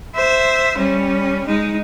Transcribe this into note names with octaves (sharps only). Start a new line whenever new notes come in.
C5 E5
G3 C#4
G#3 D#4